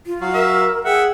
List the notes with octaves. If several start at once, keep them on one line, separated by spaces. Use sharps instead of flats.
F4
F#3 F#4 F5
A#4 E5
G#4 E5 F#5 G5